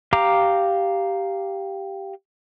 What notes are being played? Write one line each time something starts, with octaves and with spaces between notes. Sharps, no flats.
G4 F5 A#5 D6